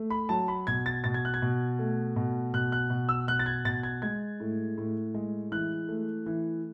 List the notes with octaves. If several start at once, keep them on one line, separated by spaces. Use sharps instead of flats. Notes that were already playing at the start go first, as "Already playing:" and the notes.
Already playing: A3
B5
F#3 A5
B5
B2 G#6
A6
B2 A6
G#6
F#6
G#6
B2
A3
B2
B2 F#6
F#6
B2
E6
B2 F#6
A6
G#6
B2 A6
G#6
G#3 G#6
A2
A2
G#3
E3 F#6
A3
E3